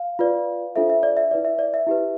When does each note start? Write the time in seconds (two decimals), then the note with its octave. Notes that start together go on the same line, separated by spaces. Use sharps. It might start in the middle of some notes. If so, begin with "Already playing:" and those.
Already playing: F5
0.19 F4 B4 D5
0.76 D4 F4 A4 C5 E5
0.90 E5
1.03 D5
1.17 E5
1.31 E4 B4 D5
1.45 E5
1.59 D5
1.74 E5
1.87 E4 G4 B4